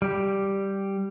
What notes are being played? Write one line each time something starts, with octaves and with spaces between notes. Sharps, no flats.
G3 G4